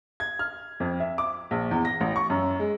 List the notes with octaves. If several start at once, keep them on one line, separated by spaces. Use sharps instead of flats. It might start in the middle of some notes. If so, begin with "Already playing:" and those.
G#6
F6
F2
E5
D6
A#1
E2
A#6
A1
C#6
F#2
G#3